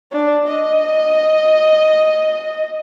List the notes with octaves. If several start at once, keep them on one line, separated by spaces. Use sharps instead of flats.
D4
D#5